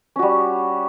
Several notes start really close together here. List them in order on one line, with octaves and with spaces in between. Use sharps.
C#4 F#4 G3